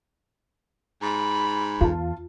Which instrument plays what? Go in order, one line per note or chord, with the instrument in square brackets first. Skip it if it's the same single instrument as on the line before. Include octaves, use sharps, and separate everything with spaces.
[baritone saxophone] G#2 [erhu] B5
[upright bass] E2 [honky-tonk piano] F4 A5